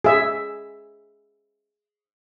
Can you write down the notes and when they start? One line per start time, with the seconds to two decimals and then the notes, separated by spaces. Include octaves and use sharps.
0.04 G#4 E5